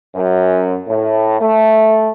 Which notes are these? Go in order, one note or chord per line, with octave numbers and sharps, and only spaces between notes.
F#2
A2
A3